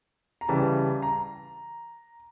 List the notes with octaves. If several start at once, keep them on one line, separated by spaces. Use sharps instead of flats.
A#5
C#3 E3 G3 A5
A#5